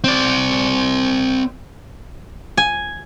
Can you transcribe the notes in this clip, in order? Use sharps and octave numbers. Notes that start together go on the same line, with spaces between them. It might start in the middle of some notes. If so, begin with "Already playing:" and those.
C4 D5
G#5